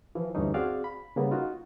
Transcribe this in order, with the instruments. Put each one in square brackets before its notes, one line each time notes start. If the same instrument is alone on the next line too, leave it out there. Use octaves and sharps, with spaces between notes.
[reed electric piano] E3 F3
D2 G2 E3 A3 C#4 D#4
C4 F#4 G#4 D5 F5
B5
C#3 G3 A#3 B3
D#4 F4 F#4